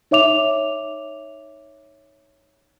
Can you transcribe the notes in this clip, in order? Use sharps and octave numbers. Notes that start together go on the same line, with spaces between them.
D#4 C#5 E5 D6 F7